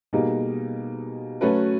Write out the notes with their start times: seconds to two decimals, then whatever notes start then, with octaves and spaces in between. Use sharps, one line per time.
0.13 B2 G3 A#3 D#4 G#4
1.41 F#3 A3 C#4 F#4 B4